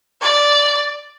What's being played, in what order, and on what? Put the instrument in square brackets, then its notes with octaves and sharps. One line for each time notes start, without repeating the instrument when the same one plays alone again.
[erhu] D5